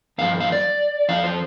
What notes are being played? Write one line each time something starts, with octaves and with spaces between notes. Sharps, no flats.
G2 F3 F5
F5
D5
F2 F3 F5
C5